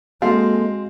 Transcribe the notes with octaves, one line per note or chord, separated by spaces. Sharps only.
G#3 A#3 C4 F#4 A4 D#5 F5